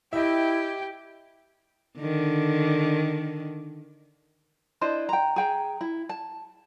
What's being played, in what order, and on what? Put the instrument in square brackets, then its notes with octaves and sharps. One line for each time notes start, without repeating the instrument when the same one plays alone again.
[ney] E4 [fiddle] G4 G5 [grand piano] D#5 E5
[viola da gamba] D3 D#3
[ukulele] D4 E4 C5 D#5
G5 A#5
G#4 G5 A#5
E4
A5